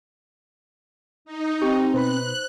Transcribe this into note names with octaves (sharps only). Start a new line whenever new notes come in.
D#4
C4 G4 G5 C#6
B2 B4 C5 B5 F#6